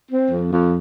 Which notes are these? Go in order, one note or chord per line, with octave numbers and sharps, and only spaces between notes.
C4
F2
F2